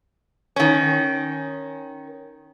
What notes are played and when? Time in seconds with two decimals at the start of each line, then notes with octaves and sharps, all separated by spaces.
0.56 D#3 C#4